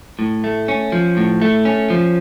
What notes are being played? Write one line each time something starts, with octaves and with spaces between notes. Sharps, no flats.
A2
A3
C#4
F3
A2
A3
C#4
F3